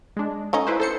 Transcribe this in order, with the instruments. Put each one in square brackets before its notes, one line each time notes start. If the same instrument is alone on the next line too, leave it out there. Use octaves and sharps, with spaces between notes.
[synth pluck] G#3 D4
[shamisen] A3 C#4 D#4
[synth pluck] E4 B4 C5
A4 C5 C#7